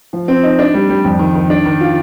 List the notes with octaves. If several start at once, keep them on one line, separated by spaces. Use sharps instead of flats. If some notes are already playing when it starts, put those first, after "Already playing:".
F3
C4
D#4
D4
G3
G3
F2
D#3
D#3
D4
D#3
F4